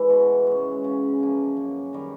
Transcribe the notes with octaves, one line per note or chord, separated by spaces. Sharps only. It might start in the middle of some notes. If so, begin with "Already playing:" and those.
Already playing: E3 G#3
B2
G#3 C#4
C#3
F3 A#3
F#2
D#3 G3